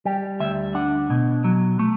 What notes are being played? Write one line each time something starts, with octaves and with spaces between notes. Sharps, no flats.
G3 G4
D2 E5
D4 F#5
B2
F#3
A3